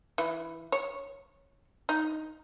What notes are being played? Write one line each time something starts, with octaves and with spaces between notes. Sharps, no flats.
E3
C#5
D#4